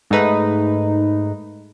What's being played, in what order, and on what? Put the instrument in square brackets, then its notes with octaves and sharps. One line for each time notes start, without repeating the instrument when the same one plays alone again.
[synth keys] G#2 A3 D#4 B4